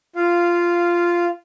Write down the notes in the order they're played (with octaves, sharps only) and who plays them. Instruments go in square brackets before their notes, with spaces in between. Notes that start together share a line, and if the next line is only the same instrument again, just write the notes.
[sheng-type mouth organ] F4 F5